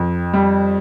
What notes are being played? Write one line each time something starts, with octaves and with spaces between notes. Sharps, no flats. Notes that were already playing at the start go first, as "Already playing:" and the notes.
Already playing: F2
G3